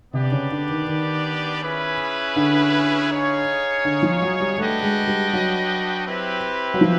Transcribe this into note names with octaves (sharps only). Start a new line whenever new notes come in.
C3 B3 D4 G4 B4 D5
C#3
D3
D#3
D#3
C#4 E4 G#4 B4
D3
D#4 G#4 C#5 F5
D3
F3
F#3
G3
A3 D4 F#4 B4 D#5 G5
G#3
G3
F#3
C4 E4 G4 B4
F#3
F3